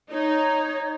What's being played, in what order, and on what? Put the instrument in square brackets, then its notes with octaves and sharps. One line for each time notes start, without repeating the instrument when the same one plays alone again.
[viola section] D#4 [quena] C#5